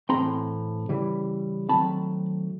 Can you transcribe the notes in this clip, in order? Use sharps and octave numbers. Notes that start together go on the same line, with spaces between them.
A2 E3 A3 C4 A#5 C6
C#3 E3 G3
D#3 F#3 A3 C4 A5 B5